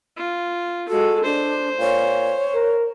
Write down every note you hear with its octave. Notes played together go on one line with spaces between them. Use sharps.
F4
G#3 F#4 A4
D4 C5
A#2 C#5
A#4